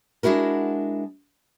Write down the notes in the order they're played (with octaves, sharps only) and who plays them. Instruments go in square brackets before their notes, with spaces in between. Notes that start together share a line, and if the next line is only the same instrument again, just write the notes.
[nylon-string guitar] G#3 D4 E4 F#4 A#4